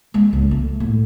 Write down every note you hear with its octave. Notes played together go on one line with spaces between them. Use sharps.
G#3
C#2
A3
A2